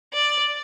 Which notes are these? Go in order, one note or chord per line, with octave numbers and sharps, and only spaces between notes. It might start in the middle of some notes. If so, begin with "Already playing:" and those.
D5